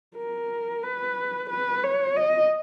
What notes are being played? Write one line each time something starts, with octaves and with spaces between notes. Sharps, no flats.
A#4
B4
B4
C#5
D#5